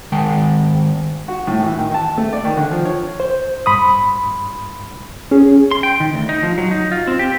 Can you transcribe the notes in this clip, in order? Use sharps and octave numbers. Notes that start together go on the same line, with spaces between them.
D#3 G#3 G5 A5
F#4
A2
E3
D#3
A5
A3
D5
D#3
D3
F3
C#5
C5
G2 B5 C6 D#6
C#4 G#4
C6
G5
D#3
D2
D#4
F3
F#3
D#4
F4
C4
G4